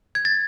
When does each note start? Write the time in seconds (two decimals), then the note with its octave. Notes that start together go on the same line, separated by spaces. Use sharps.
0.15 G#6
0.25 A6